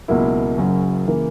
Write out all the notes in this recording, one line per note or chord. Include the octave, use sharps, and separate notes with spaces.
C#2 B2 F#3 A#3 E4
F#1 F#2 C#3 F#3 C#4
C#3 E3 A#3